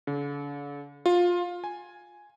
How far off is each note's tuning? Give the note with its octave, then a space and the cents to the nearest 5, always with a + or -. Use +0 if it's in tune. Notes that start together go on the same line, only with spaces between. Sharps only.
D3 -45
F4 +15
G#5 +0